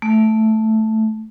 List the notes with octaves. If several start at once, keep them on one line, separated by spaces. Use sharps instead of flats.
A3